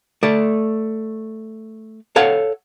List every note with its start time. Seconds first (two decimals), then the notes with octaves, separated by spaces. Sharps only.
0.23 A3 D5
2.16 A4 C#5 F5 F#5